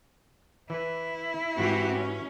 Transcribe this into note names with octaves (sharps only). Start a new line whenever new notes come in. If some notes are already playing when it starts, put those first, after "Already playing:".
E3 E4 B4
G#2 E3 C4 F#4 G4
C#4